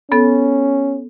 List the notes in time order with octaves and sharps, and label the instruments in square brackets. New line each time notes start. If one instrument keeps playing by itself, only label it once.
[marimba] B3 A4 [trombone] C#4